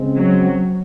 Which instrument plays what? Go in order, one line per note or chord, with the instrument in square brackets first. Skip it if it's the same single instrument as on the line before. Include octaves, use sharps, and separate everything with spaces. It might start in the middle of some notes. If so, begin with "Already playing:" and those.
Already playing: [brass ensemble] C#3 G#3 C4
[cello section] F#3